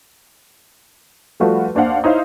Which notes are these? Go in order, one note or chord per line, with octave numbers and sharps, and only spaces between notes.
F3 G3 A3 F4 F#4 B4
D#2 D4 C5 F5 F#5
D#4 E4 C5 C#5 F5